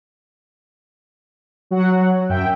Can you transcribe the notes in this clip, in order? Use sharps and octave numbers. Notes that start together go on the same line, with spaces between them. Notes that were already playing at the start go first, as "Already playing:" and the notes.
F#3 F#4 F#5
F#2 E5 G5